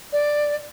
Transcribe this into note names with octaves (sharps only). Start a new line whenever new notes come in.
D5